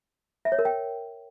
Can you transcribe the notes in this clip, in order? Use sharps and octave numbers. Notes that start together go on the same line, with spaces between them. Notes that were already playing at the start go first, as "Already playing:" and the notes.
E5
C#5
A#4
G5